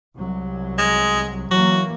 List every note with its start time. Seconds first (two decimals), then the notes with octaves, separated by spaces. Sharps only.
0.16 C2 F#3
0.78 G#3
1.51 E3 F#3 A#3 F#4